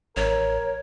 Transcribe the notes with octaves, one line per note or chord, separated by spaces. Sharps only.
A1 A#4 C#5